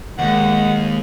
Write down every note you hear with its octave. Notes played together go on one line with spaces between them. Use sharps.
D#2 D#3 G#3 F#5